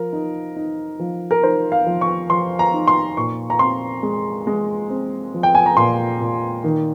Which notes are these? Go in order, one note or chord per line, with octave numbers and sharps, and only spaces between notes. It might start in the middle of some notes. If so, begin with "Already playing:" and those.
Already playing: F3 A#4
D#4
D#4
F3
A#4
D#4 C5
F5
F3
C#6
F3 C6
A#5
D#4
C6
A#2 C#6
A#5
C4 C6
G#3
G#3
C4
F3
G5
G#5
A#5
A#2 C6
A#2
D#3